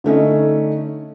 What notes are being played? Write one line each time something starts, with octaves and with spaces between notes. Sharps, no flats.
D3 A3 C#4 D#4